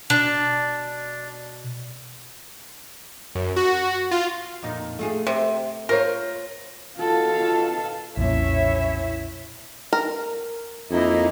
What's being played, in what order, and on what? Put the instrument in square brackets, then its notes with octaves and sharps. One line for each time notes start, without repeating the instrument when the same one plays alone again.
[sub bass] B2 [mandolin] D4
[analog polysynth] F#2
F#4
F4
[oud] F2 A#2 D#4
A3 F4 G#4
[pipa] C3 [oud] C5
[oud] F4 C5 C#5 [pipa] A#4
[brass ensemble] B2 F4 [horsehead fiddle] A4 F5
[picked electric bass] B1 F2 A#2 [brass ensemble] C#4 E4 [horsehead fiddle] C#5 E5
[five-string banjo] A#4
[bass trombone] F2 [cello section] A#3 D#4 E4